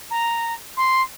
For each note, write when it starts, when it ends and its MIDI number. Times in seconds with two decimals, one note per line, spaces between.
0.10 0.54 82
0.76 1.01 84